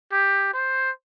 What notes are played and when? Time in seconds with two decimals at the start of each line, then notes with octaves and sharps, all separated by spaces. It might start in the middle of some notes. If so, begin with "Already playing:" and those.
0.12 G4
0.53 C5